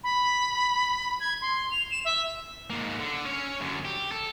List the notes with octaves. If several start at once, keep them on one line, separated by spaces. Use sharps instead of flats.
B5
G#6
C6
F7
E7
E5
G#2 A#3
D3
C#4 C#5
F#2 D3
G4
A4